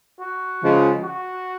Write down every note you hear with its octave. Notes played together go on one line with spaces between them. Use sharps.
F#4
C#3 F3 G#3
F#4